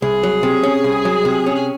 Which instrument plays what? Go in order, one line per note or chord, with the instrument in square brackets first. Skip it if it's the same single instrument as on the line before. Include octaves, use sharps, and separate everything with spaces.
[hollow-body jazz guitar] C2 [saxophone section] G#4
[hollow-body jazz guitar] F#3
C3
C#4
C2
F#3
C3
C#4
[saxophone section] G#4